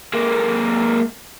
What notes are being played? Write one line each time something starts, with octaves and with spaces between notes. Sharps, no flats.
G#3 A#3